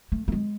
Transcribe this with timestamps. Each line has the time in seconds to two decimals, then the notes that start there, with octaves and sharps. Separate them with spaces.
0.12 A3
0.28 A3
0.32 G#3